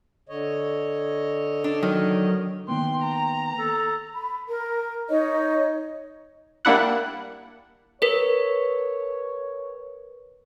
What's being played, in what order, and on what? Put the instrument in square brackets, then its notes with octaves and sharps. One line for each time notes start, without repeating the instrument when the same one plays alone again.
[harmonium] D3 C#5 D#5
[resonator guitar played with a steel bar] D4
[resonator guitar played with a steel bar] D#3 [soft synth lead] F#3
[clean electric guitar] D#3 A#3 B3 [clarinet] G5 [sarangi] C6
[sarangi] A#5
[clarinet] A4
[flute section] B5
A#4
D#4 C#5 D#5
[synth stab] G3 A#3 D4 E4 F#5
[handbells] A#4 B4 [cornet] C#5